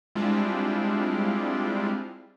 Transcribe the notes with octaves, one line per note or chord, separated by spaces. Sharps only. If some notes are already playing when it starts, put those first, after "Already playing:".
G3 G#3 C4 D4 E4 F4